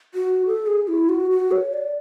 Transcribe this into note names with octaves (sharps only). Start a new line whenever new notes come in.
F#4
A4
G#4
E4
F#4
F#4
C#5
D5